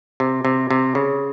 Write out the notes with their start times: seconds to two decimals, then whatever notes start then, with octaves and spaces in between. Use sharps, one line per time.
0.20 C3
0.45 C3
0.71 C3
0.95 C#3